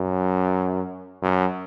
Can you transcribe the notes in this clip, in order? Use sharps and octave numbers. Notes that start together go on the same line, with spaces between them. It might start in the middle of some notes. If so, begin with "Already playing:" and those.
Already playing: F#2
F#2